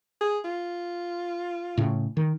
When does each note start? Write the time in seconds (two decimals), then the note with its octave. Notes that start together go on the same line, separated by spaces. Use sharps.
0.21 G#4
0.44 F4
1.77 A2 C#3
2.17 D#3